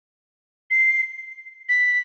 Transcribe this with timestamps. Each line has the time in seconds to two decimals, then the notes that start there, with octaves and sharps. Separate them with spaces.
0.70 C7
1.69 B6